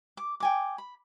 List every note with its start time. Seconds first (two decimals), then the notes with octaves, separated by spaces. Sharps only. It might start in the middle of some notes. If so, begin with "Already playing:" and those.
0.17 D6
0.40 G5 G#5 D6
0.78 B5